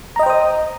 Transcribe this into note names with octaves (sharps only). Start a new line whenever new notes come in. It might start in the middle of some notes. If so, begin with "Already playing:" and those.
C5 D#5 G5 A#5 D#6